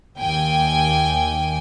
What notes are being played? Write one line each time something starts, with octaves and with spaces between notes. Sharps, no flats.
D#2 G5 G#5